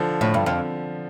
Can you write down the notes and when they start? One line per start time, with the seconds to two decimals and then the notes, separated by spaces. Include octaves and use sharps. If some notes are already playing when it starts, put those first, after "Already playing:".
Already playing: D3 F3
0.21 A2
0.34 G2
0.46 F2